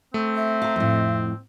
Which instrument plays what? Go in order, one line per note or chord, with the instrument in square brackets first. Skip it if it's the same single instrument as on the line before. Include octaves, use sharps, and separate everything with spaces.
[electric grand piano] A3 [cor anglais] C4
[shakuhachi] E5
[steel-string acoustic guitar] F5 A#5
F2 A2